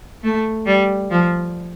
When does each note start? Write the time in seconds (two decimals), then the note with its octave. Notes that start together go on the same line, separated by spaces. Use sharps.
0.24 A3
0.66 G3
1.10 F3